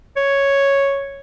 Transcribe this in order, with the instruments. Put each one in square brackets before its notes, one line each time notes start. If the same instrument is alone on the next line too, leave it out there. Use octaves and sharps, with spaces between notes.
[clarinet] C#5